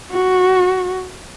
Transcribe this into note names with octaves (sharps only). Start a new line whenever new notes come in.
F#4